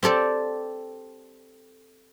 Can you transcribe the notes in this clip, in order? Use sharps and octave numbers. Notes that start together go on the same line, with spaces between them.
C4 G4 A4 D5